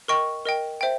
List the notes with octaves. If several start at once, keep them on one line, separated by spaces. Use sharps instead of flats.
A#4 D#5 G5 C#6
A#4 D#5 G5
C5 E5 G5